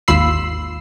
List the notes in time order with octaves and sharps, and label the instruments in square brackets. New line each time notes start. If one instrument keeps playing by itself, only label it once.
[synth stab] G#1 D#2 F4 B5 E6 C7